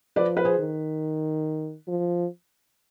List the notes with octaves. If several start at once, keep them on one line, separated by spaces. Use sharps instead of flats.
F3 B4 D5
B4
G#4 C5
D#3
F3